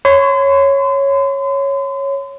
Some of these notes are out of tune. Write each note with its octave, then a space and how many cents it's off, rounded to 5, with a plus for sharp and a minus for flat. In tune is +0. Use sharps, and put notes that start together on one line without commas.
C#5 -5 C6 -40